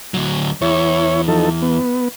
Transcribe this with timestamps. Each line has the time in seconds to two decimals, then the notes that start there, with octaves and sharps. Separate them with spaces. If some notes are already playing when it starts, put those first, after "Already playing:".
0.14 D2 F#3
0.62 E2 E4 C#5
1.28 F3 D#4 A4
1.62 B3